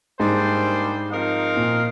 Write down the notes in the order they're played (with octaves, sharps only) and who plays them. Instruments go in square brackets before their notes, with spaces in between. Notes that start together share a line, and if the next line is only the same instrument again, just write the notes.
[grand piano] G#2 [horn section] G3 A#3 D4 G#4 C5
[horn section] F3 C4 D#4 A#4 F5
[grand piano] A#2